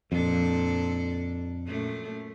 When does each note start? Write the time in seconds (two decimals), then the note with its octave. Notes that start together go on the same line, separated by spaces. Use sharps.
0.12 F2 A#2 D4 A4
1.67 F#2 A#2 A3